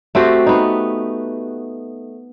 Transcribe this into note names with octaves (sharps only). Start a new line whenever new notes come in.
A3 C4 F#4 G4
B3 D#4